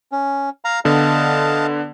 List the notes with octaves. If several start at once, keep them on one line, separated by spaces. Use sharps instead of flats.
C#4
F5 A#5
D3 B3 D#5 F5 A5